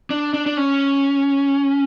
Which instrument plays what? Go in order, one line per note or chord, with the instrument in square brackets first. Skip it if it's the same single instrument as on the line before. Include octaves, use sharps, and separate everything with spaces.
[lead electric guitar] D4
D4
D4
C#4